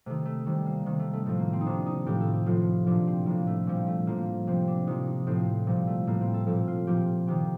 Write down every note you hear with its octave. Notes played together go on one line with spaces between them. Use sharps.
C3 D#3 A3
A3
C3 D#3 G3
A#3
C3 D#3
A3
A3
A2 F3 A3
A#3
C4
D#4
C3 D#3 D4
D#4
A2 F3 G4
A4
G4
A2 F3 F4
A#2 F3 D4
C4
A2 F3 A#3
A3
A#2 F3 G3
A3
A2 F3 A#3
C3 F3 C4
D4
C3 F3 D#4
D#4
A2 F3 C4
A#2 F3 G3
A3
A2 F3 A#3
C4
A4
A#2 F3 A4
F4
A#2 F3 G4
C3 D#3 G4